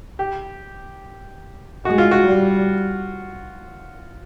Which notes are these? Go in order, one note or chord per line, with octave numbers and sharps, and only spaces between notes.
G4
G#3 F#4
F4
F#4
G3